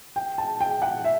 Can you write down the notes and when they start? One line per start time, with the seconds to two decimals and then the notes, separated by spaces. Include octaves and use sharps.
0.16 G5
0.38 A5
0.60 G5
0.82 F#5
1.04 E5